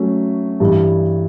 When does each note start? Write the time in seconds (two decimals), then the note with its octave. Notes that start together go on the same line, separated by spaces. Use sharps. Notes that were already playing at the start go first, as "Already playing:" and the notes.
Already playing: F#3 A3 C#4
0.60 G2 E3 G3